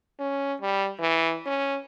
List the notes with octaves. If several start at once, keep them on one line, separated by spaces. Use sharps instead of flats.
C#4
G3
E3
C#4